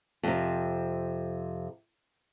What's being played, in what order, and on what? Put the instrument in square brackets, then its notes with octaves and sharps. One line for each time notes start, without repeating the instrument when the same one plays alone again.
[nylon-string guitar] F2 C3